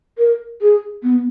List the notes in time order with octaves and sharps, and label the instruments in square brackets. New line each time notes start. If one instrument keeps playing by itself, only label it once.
[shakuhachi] A#4
G#4
B3